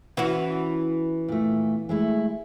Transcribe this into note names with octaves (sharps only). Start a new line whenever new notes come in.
E3 C#4 F#4
A#2 A3
G#3 A3 E4